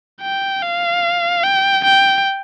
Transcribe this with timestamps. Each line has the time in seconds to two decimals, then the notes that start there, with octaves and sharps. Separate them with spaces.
0.21 G5
0.62 F5
1.44 G5
1.84 G5